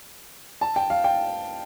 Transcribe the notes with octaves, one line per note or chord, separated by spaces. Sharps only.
A5
G5
F5
G5